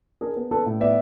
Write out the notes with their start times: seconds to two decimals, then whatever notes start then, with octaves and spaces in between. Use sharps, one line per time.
0.21 D4 G#4 A#4
0.36 B3
0.51 D4 A4 B4
0.66 A2
0.80 B3 D5 E5